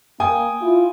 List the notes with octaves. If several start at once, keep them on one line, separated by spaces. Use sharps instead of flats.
A#3 G5 G#5 D#6
E4 F4